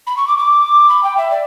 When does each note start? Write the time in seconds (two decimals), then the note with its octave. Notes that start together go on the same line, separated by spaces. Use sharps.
0.07 B5
0.17 C#6
0.28 D6
0.38 D6
0.89 B5
1.03 G5
1.17 E5
1.31 D5